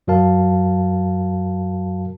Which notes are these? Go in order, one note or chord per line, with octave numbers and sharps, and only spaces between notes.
F#2 F#3 F#4 A#4 F5 A5